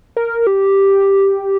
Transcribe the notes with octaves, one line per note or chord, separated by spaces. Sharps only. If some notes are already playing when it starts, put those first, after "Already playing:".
A#4
G4